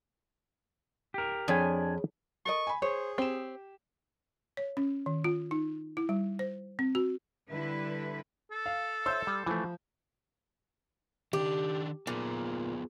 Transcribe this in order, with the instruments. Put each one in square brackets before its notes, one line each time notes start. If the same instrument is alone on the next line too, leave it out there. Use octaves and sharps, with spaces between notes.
[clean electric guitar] G4 A#4
[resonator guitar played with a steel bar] F2 [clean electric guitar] D4 G#5 [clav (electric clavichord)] G#4 C#5 G5
[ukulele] A4 A#4 D#5 [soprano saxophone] C#6
[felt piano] G#5 B5
[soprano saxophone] G#4 [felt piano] C5 [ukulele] C#5
[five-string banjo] C4 [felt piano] G4 E7
[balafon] C#5
C#4
D#3
F4
D#4
E4
G3
C5
C4
F#4
[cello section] D3 G3 E4 B4
[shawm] A4
[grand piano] F5
[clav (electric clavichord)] C5 C#5 E5 [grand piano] C6 E6 G6
[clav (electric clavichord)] G3
[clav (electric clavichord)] E3 A3 [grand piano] F3
[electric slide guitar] D#3 D4 [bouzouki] G4
[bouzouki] A#2 [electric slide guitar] B3 F4 G#4